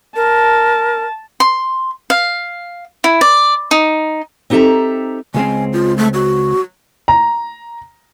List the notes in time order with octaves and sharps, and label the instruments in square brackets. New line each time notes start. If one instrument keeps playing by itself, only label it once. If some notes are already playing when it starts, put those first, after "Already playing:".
[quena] A#4 [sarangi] A5
[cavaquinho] C6
F5
E4
D5
D#4
[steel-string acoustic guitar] C4 D#4 G4 A4 E5 A#5
[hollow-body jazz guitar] C#2 G#3 C4 [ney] G#5
[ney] F4
A3
F#4
[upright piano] A#5